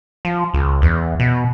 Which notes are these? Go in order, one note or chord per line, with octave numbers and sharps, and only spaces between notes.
F3
C#2
E2
B2